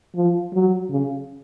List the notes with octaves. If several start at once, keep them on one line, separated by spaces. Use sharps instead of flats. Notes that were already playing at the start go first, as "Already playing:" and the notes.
F3
F#3
C#3